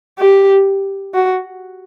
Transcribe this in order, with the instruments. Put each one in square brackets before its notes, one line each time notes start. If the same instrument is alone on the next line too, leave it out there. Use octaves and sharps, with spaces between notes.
[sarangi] G4
F#4